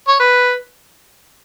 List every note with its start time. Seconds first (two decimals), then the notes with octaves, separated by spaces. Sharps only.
0.07 C#5
0.19 B4